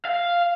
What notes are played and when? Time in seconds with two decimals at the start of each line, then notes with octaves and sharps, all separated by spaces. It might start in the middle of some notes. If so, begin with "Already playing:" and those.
0.05 F5